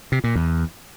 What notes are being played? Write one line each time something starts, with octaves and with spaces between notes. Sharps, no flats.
C3
A#2
E2